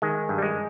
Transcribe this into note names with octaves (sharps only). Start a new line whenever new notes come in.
D#3 G#3
G2
G3
G#3